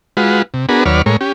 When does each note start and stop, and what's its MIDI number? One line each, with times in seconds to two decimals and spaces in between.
0.17 0.42 56
0.17 0.42 65
0.17 0.42 66
0.17 0.42 71
0.54 0.66 48
0.69 0.84 59
0.69 0.84 62
0.69 0.84 66
0.69 0.84 68
0.69 0.84 70
0.69 0.84 71
0.86 1.02 39
0.86 1.02 54
0.86 1.02 71
0.86 1.02 73
0.86 1.02 74
0.86 1.02 89
1.06 1.17 45
1.06 1.17 56
1.06 1.17 70
1.06 1.17 73
1.21 1.32 61
1.21 1.32 67